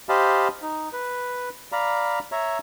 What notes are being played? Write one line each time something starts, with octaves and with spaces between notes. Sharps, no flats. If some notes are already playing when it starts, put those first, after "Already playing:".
G4 C5 D#5 F5 A5 B5
D#4
B4
D5 F5 A#5 B5
C#5 E5 A#5